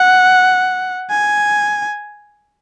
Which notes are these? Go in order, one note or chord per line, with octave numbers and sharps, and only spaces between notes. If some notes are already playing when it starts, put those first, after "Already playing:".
Already playing: F#5
G#5